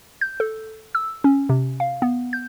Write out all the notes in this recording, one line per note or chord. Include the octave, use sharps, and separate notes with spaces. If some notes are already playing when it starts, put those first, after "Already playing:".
G6
A4
E6
C#4
C3
F5
B3
G6